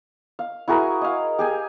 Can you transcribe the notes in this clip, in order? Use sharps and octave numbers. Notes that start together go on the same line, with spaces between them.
F5
E4 F#4 G#4 A#4
D#5 F5
G4 G#4 G#5